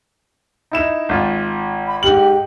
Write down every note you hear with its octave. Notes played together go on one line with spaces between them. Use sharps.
D#4 E4 E7
G#1 F4
B5
G#2 G4 F#7